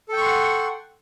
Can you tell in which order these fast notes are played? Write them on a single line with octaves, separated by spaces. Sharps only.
A4 G5 C#6 C6 F#5